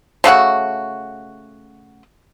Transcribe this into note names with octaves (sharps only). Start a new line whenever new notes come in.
C#3 A3 F#4 F#5